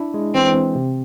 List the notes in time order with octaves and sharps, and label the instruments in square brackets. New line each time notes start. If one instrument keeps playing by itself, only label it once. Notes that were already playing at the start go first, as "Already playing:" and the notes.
Already playing: [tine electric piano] D4 E4
G#3
[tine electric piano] E3 [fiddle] C4
[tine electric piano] C4
C3